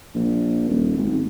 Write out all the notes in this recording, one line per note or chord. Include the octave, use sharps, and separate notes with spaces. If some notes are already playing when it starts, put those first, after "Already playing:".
A#1
D#1
G#1